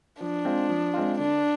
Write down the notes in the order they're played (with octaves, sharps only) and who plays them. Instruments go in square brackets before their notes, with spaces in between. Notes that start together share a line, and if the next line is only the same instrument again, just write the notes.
[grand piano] F3 [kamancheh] D4
[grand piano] G#3 C4 F4
F3
G#3 C4 F4
[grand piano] D3 [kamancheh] D4